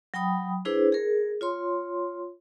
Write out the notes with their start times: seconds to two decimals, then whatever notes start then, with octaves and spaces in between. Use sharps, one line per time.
0.14 F#3 G5 B5 D#6
0.65 D4 E4 G#4 B4 C5
0.92 G#4 A#4
1.41 F4 C#5 C6